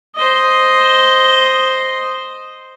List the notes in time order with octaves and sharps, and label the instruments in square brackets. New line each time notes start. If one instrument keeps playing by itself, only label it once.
[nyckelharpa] C5 D#5